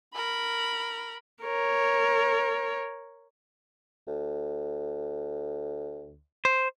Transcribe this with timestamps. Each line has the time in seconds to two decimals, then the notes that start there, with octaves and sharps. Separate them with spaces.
0.15 A#4 B5
1.43 A#4 C#5
4.08 D2
6.45 C5